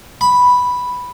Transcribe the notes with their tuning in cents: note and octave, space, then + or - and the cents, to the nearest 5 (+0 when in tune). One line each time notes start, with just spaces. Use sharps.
B5 +0